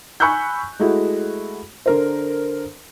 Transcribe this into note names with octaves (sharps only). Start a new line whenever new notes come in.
G#5 B5 C#6 E6 F#6 G6
G#3 A3 E4 F#4
D3 A#4 C5